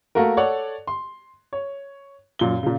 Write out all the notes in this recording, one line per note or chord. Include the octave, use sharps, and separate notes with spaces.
A3 A#3 F#4 A#4
A4 C#5 D5 F#5
C6
C#5
F#2 A#2 G7
A#2 C#3